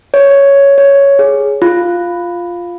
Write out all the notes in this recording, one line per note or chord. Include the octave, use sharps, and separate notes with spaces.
C#5
C#5
G#4
F4